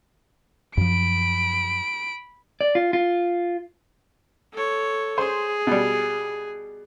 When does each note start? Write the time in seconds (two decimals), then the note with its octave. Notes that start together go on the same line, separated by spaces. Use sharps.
0.77 F#2 F3 B5 D7
2.61 D5
2.75 F4
2.93 F4
4.53 A4 C#5
5.18 G#4 C5
5.67 B2 G3